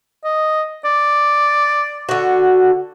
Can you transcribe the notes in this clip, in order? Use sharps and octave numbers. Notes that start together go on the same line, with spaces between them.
D#5
D5
D3 F#4